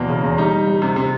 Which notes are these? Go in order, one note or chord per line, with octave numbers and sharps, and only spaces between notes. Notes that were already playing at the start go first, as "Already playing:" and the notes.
Already playing: E2 B2 A#3
C#3
E2
G3 D#4
G3
G3
C3
C3